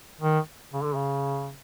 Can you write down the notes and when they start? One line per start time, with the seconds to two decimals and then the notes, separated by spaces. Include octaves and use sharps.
0.21 D#3
0.73 C#3
0.84 D3
0.95 C#3